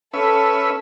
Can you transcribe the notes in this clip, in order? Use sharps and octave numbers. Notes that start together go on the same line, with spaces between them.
C#4 A4 B4 E5